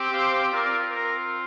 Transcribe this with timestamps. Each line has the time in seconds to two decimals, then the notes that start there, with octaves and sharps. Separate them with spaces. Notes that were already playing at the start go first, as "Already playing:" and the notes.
Already playing: C4 G4
0.13 C5 F5
0.52 C4 F4 A#4 D5
0.90 A#4